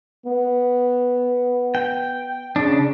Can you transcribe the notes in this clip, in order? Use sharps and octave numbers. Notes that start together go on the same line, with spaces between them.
B3
G5
C#3 D4